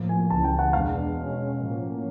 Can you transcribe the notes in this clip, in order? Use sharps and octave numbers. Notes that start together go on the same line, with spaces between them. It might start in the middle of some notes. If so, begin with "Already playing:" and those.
Already playing: A2 F3 A#3
G#5
C#2 C#3 E3 A5
G5
F#5
E2 B2 G#3 B3 D4 F5
B2 G#3 C#4
A2 F3 A#3 C#4